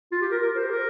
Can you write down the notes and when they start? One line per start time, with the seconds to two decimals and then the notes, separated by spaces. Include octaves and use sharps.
0.12 F4
0.22 G4
0.31 A#4
0.42 A#4
0.55 C5
0.63 G4
0.71 A#4